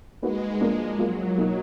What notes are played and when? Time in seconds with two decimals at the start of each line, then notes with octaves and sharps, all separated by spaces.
0.22 G#3 A#3 D#4 F#4 B4
0.61 F3 A#3 D4
0.99 F3 F#3 A#3 F4
1.37 B2 A#3 D#4 A#4